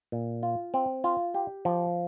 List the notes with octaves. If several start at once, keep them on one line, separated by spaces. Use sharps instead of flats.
A#2
F4
C4
F4
G4
F3